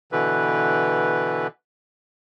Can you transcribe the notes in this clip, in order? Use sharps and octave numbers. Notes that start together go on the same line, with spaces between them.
B2 D3 E3 B4